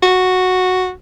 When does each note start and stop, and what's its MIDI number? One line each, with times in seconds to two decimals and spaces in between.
0.03 0.91 66